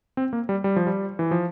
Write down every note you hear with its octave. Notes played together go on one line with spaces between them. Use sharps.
C4
A#3
G3
G3
F3
G3
E3
F3